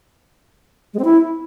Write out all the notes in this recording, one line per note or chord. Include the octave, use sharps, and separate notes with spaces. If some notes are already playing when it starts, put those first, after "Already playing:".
G#3
C4
E4